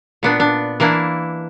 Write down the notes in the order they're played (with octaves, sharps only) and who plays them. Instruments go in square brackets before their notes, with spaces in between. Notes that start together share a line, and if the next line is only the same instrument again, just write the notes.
[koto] A#2 B3 D4
D4
E3 A#3 D4 E4